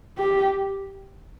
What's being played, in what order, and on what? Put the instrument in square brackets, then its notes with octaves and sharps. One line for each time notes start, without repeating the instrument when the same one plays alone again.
[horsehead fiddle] G4